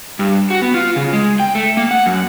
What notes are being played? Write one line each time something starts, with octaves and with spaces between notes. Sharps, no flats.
G2
F#4
B3
F4
C#3
G#3
G5
A3
A#3
F#5
F#2